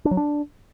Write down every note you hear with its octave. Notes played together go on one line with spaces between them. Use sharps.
D4
F#3
D4